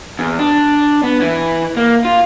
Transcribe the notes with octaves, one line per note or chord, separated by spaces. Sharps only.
E2
D4
B3
E3
A#3
F4